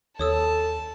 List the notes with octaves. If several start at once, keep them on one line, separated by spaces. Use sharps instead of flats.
D#2 A4 C#5 A5 D#6 E6